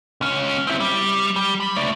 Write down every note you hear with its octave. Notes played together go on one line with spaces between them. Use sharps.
C#2 C#4
C4 E4
G3
G3
B5
A3 D5